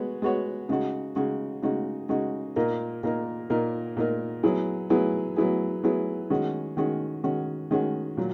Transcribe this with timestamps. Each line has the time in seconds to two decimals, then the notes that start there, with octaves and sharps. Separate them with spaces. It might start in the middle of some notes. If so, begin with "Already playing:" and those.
Already playing: G#3 B3 F#4 C#5
0.22 G#3 B3 F#4 C#5
0.69 C#3 G#3 D#4 F#4
1.16 C#3 G#3 D#4 F#4
1.62 C#3 G#3 D#4 F#4
2.09 C#3 G#3 D#4 F#4
2.56 A#2 A#3 D#4 A#4
3.03 A#2 A#3 D#4 A#4
3.50 A#2 A#3 D#4 A#4
3.97 A#2 A#3 D#4 A#4
4.43 F#3 B3 E4 G#4
4.90 F#3 B3 E4 G#4
5.37 F#3 B3 E4 G#4
5.84 F#3 B3 E4 G#4
6.30 D#3 G#3 C#4 F#4
6.77 D#3 G#3 C#4 F#4
7.24 D#3 G#3 C#4 F#4
7.71 D#3 G#3 C#4 F#4
8.17 A#2 F#3